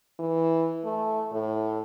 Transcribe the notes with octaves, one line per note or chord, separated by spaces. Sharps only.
E3
A3
A2